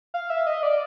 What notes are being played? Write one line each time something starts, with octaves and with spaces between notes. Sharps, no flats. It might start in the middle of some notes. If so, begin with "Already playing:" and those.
F5
E5
D#5
D5